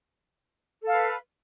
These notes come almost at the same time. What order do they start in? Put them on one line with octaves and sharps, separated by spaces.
A4 F5 B4